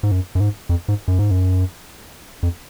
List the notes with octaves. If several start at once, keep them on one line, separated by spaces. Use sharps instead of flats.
G#2
F#2
F#2
G#2
F2
G#2
F#2
G#2
F#2
F2